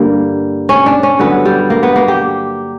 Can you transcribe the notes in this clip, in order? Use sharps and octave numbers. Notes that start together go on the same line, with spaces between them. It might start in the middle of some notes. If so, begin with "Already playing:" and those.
Already playing: G2 D3 G3 A#3
C#4
D4
C#4
G2 D3 F#3 B3
G3
A#3
B3
A#3
G4